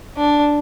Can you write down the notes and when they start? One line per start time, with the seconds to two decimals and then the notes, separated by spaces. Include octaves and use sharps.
0.16 D4